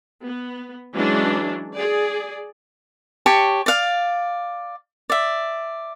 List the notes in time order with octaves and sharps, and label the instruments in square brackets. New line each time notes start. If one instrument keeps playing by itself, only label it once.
[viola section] B3
E3 F#3 G#3 C#4 D4
G#4 D5
[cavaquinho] G4 C#5 A5 C#6
D5 F5
D5 E5